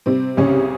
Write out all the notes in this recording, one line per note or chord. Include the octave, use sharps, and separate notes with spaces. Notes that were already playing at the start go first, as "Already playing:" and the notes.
C3 G3 C4
C2 C#3 C#4